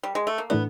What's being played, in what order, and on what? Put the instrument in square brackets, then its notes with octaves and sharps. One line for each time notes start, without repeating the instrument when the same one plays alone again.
[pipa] G3
G#3
A3
A#3
[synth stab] A2 E3 A3 D4 [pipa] B3